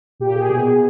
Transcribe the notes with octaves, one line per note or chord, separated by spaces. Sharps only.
A#2 G4
G#4
B2 G#4
G#4